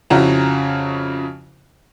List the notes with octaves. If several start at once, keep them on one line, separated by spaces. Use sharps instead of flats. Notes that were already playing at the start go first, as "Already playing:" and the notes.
F2 C#3 C#4 E4 F#4 A#5